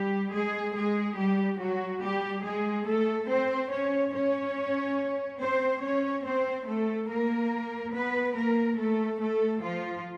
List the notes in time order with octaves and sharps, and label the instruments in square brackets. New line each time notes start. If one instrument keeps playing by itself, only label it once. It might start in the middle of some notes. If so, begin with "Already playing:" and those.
Already playing: [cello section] G3 G4
G#3 G#4
G#3 G#4
G3 G4
F#3 F#4
G3 G4
G#3 G#4
A3 A4
C4 C5
C#4 C#5
C#4 C#5
C4 C5
C#4 C#5
C4 C5
A3 A4
A#3 A#4
B3 B4
A#3 A#4
A3 A4
A3 A4
F3 F4